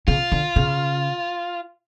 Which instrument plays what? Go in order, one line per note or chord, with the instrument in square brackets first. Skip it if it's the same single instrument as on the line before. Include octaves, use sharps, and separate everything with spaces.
[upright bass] C#3 [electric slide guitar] F4
[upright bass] D3
C#3